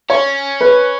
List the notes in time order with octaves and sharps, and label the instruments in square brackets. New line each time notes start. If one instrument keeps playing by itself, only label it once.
[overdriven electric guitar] C#4 [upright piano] C#5
[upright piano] B4